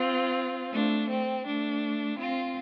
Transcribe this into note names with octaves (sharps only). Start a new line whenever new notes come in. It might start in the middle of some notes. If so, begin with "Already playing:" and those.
Already playing: C4 F4
A3 D4
C4
A3 D4
C4 F4